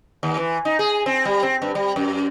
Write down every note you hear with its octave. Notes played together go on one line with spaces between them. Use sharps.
D#2
E3
D#4
G#4
C4
G3
C4
G2
G3
F#2